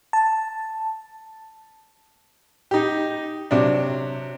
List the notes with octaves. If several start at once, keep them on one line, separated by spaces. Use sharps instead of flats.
A5
D#4 G4
C3 F#3 D4